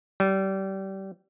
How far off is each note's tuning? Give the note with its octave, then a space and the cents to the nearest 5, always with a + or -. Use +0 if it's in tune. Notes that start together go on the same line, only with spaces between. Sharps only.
G3 -25